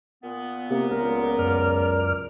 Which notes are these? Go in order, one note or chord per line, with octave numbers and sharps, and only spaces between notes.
A#2 B3
C3 A#3
C#2 A#4
F#2 D5 F6